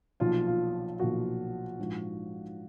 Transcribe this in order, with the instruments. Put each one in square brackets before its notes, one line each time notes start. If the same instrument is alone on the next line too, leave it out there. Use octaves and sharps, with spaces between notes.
[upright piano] B1 A#2 F3 F4
F4
B1 A#2 F3 F#4
A#1 G#2 F3